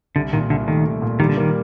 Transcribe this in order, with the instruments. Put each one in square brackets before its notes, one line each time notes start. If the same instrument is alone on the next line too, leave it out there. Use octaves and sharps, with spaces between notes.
[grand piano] C2 [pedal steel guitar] D3
[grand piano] A#2 [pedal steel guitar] D#3
[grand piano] C2 [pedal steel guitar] D3
[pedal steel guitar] D#3 [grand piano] A3
[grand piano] C2
A#2
[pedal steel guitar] D#3 [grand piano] G3
[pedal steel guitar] D3
[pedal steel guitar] D#3 [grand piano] A#3